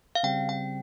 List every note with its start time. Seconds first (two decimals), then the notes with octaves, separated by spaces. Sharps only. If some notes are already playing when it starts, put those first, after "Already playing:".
0.15 F5
0.23 C#3 G3 C4 G5
0.49 G5